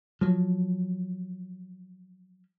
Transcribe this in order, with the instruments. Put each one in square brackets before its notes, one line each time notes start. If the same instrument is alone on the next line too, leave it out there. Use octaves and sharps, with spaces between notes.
[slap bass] F3 F#3